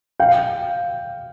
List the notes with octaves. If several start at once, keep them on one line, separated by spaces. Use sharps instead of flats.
F5 G5